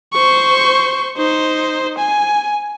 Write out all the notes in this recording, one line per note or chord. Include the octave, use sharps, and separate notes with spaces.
C5 C#6
D#4 C5
G#5